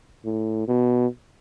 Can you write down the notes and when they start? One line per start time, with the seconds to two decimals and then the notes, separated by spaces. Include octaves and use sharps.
0.25 A2
0.68 B2